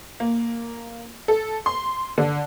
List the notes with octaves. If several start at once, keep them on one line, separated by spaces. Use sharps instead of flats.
A#3
A4
C6
D3